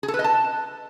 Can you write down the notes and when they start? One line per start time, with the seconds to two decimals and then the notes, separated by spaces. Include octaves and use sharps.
0.03 G#4
0.08 A4
0.14 B4
0.19 D#5
0.24 A5